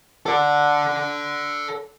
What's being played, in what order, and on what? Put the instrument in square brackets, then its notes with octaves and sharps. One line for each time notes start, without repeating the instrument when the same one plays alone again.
[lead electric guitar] A4 D5